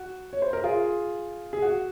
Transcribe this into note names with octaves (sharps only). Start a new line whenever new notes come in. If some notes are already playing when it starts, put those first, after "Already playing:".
Already playing: F#4
C#5
C5
A#4
F4 G#4
G#4
F#4